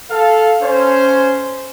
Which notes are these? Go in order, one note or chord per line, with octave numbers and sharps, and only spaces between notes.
A4 F5
C#4 C5